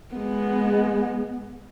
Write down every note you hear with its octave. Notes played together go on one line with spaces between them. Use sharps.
G#3 B3